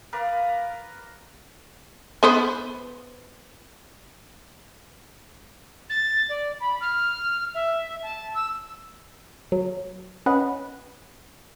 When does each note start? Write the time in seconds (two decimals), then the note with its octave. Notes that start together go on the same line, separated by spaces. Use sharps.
0.13 A#4 B4 D5 F5
2.23 B3 B4 C5
5.89 A6
6.29 D5
6.60 B5
6.80 F6
7.54 E5
8.02 A5
8.34 E6
9.52 F#3
10.26 C#4 B4 D#5 F#5